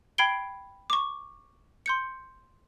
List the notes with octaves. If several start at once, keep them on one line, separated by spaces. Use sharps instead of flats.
G5 B5 G#6 C7 D7 G7
C#6 D6
C6 G6 C#7